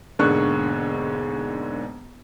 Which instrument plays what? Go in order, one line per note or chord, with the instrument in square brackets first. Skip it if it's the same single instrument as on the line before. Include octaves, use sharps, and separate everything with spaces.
[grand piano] E1 G#2 D3 A#3 C#6 F#6